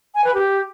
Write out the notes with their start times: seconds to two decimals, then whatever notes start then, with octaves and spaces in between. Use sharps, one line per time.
0.15 G#5
0.24 B4
0.34 G4